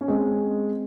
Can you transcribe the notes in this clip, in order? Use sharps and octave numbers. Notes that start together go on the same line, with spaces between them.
C#4
G#3 C4